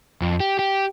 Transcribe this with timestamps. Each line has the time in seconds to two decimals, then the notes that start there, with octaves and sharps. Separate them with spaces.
0.22 F2
0.40 G4
0.59 G4